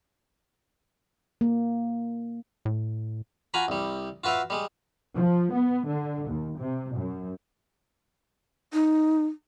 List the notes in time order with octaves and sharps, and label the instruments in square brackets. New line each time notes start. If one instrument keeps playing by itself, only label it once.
[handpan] A#3
[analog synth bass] A2
[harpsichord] F4 F#4 G#5 A#5 B5
C2 G3
F4 F#4 B4 E5 F5
G3 G#3
[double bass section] F3
B3
D3
D#2
C3
F#2
[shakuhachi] D#4